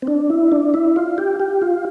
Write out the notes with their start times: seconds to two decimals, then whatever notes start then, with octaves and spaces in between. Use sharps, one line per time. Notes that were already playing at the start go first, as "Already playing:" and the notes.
0.02 C4
0.07 D4
0.30 E4
0.52 D4
0.74 E4
0.96 F4
1.18 G4
1.40 G4
1.62 F4